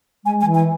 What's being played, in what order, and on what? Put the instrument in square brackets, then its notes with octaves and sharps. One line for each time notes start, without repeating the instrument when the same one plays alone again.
[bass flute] G#3 [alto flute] G#5
[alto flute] G#5
[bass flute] E3
[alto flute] G#5